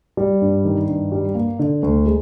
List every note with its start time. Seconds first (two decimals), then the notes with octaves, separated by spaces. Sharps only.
0.17 G3
0.41 G2
0.65 D#3
0.88 G2
1.12 G3
1.35 A#3
1.59 D3
1.83 D2
2.06 G#3